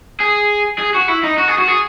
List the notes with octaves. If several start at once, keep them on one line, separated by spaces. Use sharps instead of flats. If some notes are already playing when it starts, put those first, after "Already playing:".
G#4
G#4
F#4
E4
D#4
F#4
G#4
F#4
G#4